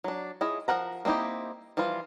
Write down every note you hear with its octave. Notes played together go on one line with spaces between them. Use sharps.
F#3 D4
E4 F4 G#4 C#5 D#5
F3 A4 A#4 F#5 A#5
A#3 C4 D#4 E4 G4
E3 F3 G3 F4